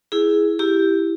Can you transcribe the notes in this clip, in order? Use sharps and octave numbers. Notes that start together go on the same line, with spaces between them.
E4 G#4
E4 G4